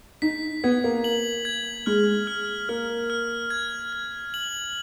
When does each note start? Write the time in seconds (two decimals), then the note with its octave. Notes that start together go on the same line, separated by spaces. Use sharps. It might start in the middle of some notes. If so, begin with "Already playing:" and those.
0.22 D#4 B6
0.64 B3 G#6
0.84 A#3
1.04 F#7
1.45 G#6
1.86 G#3 F6
2.27 F6
2.69 A#3 F6
3.10 F6
3.50 G#6
3.93 G#6
4.34 F#7